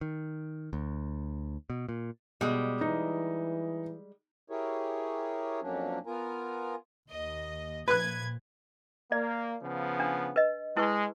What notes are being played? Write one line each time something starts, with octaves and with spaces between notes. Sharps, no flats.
D#3
D2
B2
A#2
B2 G3 G#3
E3 D#4
E4 G4 G#4 A#4 C#5
F2 F#3 A#3 C#4 D4
B3 F4 A#4 G#5 A#5
D#2 D#5
A#2 F3 B4 F#6 G#6
A#3 D5
C#3 F3 B3
D4
B4 D#5
G#3 E4 B4 C#6